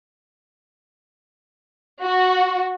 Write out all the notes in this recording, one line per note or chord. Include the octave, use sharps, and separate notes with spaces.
F#4